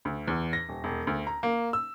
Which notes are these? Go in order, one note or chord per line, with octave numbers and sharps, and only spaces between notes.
D2
E2
A#6
D#1
E1
D2
A#5
A#3
E6